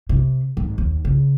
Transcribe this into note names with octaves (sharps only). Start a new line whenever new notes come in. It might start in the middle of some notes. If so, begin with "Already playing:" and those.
C3
G#1
D#2
C#3